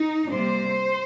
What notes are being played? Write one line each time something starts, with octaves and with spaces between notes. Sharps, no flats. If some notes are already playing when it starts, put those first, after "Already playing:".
Already playing: D#4
C3 G3 A#3 C5